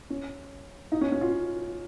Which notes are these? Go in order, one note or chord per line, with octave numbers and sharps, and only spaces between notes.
C#4
D#4
C#4
C#4
F4